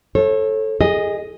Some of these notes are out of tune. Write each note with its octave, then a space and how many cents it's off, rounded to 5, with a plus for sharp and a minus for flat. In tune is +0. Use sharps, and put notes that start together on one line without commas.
A4 +0 C#5 -35
G#4 -25 D#5 +0